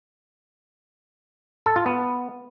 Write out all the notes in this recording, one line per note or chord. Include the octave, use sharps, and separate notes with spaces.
A4
F4
B3